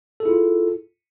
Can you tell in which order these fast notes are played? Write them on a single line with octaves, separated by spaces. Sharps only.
A4 G#4 E4 F4